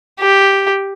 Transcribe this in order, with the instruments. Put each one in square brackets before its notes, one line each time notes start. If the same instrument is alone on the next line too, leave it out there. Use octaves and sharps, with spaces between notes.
[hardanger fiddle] G4